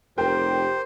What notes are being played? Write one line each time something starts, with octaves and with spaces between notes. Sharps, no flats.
F1 G4 A#4 C5 G5